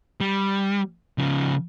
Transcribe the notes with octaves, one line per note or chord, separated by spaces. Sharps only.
G3
C#3 F3